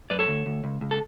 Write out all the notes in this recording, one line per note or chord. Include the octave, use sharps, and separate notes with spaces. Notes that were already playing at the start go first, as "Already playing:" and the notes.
F#2 B4 D5
A4 C#5
D2
D2
C#2
C#2
A4